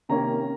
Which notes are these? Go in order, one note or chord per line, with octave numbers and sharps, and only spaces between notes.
C3 D#3 A#3 C#4 A#5